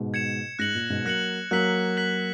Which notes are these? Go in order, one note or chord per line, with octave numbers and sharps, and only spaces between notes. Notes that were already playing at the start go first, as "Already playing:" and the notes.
Already playing: G#2 B2
G#6 C#7 E7
G#2 F#6 A#6 C#7 F#7
A#2
G#2 B2
F#3 A#3 F#6 A#6 C#7 F#7
F#3 A#3 F#6 B6 F#7
F#6 B6 F#7